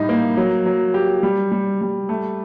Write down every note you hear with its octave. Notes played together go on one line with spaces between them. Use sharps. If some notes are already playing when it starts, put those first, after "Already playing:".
Already playing: A2 G3 D#4
A#3
F#3
F#3
G4
G3
G3
G3
A3